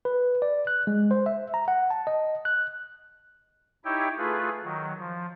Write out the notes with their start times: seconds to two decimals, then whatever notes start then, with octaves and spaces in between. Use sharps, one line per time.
0.05 B4
0.42 D5
0.67 F#6
0.87 G#3
1.11 C5
1.26 E5
1.54 A#5
1.68 F#5
1.90 A5
2.07 D#5
2.45 F#6
3.85 D#4 E4 G4 C#5 E5 G5
4.18 A3 F4 G#4 B4
4.64 D#3 F#3
4.99 F3